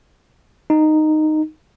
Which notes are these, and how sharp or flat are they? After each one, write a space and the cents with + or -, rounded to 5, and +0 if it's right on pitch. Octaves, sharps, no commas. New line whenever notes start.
D#4 -10